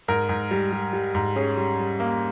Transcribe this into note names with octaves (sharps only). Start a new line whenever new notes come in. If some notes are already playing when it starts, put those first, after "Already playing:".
G#2 A#4
G#2
G3
G3
G3
G#2
C#4 G#4
G3
G3
A#3